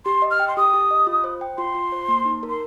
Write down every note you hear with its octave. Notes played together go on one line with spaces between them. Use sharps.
G4 C6
D#5
F6
G5
C6
G4 D#6
G4
D#5
F4
C5
G5
F4 C6
F4
C5
A#3
D#4
A#4
C6